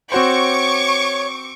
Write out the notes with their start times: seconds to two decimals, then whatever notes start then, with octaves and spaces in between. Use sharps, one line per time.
0.12 C4 F#4 C5 C#5 C#6 D6